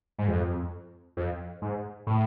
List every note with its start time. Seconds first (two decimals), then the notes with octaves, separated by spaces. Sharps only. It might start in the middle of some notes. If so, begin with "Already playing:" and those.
0.19 G#2
0.28 F2
1.17 F2
1.62 G#2
2.07 A2